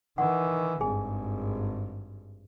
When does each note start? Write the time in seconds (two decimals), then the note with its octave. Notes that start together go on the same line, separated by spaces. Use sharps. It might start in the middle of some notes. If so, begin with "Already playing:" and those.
0.18 D#3 E3 F#5
0.81 G#1 G2 G#4 G#5